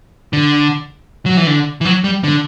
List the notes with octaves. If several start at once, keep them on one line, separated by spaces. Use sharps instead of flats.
D3
F#3
E3
D3
E3
F#3
G3
D3